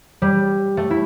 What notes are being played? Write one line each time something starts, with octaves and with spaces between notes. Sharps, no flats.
G3
A3
E4